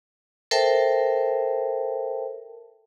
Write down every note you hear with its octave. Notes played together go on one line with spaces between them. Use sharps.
A4 A#4 C5 E5 G5 A5